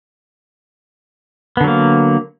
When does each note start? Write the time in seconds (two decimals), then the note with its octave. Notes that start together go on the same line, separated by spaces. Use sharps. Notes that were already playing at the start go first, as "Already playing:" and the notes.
1.57 B3
1.61 D3
1.64 F#3
1.67 A#3